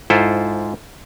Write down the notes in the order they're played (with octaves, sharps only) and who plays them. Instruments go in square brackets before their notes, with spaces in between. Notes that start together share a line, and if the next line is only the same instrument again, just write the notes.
[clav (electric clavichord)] G#2 E4 F4 A4 C5